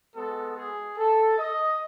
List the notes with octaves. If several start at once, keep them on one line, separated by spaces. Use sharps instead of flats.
G#3 B3 F#4 A4
G#4
A4
D#5